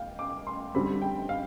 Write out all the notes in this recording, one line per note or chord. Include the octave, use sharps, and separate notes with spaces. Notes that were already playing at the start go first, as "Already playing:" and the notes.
Already playing: F5 G5
D6
C6
D3 G3 C4 B5
G5
F5